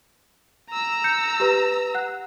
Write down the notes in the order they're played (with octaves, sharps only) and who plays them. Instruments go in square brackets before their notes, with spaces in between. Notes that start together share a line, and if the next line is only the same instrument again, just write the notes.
[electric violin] A#5 E6
[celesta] G6 C#7
G4 B4
F#5 F#6